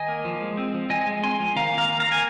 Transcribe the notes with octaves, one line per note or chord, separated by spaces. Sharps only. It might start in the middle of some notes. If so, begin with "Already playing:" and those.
Already playing: D#3 D#5 G#5
A#3
F3
G#3
C4
F3
F3 D#5 G#5
G#3
C4 G#5 C6
F3
D#3 F5 A#5
A#3
F5 A#5
D#3
F5 A#5
A#3
G#5